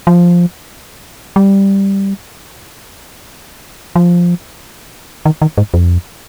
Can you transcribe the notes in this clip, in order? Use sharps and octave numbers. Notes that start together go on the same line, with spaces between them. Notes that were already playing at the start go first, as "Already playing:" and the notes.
F3
G3
F3
D#3
D#3
G#2
F2